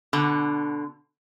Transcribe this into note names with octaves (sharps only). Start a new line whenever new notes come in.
B2 D3